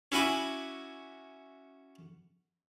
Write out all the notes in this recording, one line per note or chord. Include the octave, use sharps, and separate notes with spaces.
C#4 E4 F#4 G#5 B5 D6